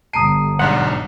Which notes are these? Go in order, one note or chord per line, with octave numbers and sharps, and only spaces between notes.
G1 A5 A#5 D#6 C7 D7 D#7
B1 G#2 D4 F#5